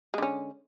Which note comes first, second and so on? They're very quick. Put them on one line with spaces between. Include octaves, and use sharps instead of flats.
G#3 D3 C#4